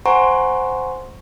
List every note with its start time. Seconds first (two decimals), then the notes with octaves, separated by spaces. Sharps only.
0.06 C5 F#5 G#5 A#5 C6 C#6